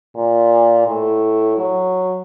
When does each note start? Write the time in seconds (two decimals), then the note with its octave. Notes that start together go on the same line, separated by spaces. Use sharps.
0.16 A#2
0.87 A2
1.57 F#3